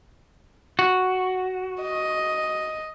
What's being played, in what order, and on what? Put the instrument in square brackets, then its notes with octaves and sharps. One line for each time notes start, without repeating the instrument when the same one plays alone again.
[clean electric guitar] F#4
[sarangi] D#5